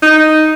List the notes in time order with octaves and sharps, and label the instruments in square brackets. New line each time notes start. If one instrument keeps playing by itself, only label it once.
[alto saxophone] D#4